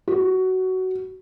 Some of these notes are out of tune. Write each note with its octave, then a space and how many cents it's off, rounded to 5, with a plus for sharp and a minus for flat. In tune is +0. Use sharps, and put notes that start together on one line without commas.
F#4 +15